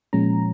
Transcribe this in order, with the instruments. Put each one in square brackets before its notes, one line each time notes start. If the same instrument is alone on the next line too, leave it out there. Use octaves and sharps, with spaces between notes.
[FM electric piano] A#2 F3 G#3 C#4 A#5